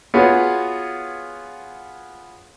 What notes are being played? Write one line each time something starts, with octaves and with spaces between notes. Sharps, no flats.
B3 F4 F#4 G#4 B4 C#5